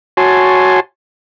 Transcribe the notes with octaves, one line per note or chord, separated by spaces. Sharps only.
F#4 C#5 G#5 A5 C6